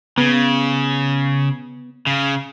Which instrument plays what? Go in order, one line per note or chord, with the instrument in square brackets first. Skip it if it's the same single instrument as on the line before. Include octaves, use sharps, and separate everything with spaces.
[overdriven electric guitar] C#3 [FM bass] B3
[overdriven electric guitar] C#3